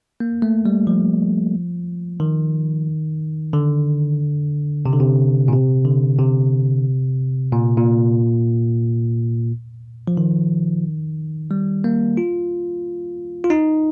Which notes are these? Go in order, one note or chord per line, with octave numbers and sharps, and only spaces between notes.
A#3
A3
G3
F3
D#3
D3
C3
D3
C3
A#2
C3
D3
C3
A#2
A#2
F3
D#3
G3
A#3
F4
F4
D#4